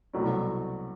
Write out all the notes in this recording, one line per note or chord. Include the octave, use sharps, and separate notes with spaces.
C2 B2 F#3 A3 C#4